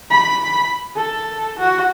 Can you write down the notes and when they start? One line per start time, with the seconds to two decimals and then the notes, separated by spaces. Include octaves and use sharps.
0.11 B5
0.97 A4
1.59 F#4